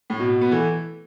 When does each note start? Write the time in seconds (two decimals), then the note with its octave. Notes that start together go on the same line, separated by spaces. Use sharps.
0.10 A2
0.20 B2
0.41 B3
0.51 E3 A3